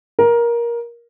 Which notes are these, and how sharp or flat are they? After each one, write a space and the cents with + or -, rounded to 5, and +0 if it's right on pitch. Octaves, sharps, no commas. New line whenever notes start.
A#4 +15